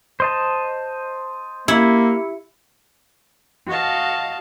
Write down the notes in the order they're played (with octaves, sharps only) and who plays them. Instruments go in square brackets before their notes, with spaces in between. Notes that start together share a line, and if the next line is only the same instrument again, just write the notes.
[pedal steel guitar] C5 D#5 A5
[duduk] A#3 [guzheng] E4 [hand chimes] G4 C#7
[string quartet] F#4 D#5 F5 A5